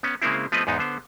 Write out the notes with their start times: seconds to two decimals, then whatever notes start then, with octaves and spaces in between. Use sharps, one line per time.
0.03 B3 C#4
0.22 C#3 G#3 A#3 C4 E4
0.52 F3 A3 B3 C4 B4 D#5
0.67 E2 G#2 B3 D#4
0.79 D3 B3 C5